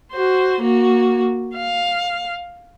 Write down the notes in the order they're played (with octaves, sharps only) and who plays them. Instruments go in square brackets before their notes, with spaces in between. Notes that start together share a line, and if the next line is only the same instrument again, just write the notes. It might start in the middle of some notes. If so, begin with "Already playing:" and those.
[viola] F#4 C5
A#3 F#4
F5